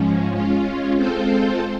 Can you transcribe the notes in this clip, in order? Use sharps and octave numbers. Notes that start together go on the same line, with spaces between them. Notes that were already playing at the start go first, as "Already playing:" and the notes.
Already playing: G#2 F3 G#3 C#4
G#3 C#4 F4
G#3 C4 F4 A4 C5